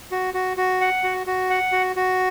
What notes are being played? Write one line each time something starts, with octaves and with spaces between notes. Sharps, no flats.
F#4
F#4
F#4
F#5
F#4
F#4
F#5
F#4
F#4